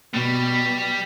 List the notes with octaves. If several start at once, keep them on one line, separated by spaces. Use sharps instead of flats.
B2 G3